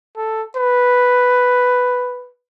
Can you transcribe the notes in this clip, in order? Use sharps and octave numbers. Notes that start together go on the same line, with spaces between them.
A4
B4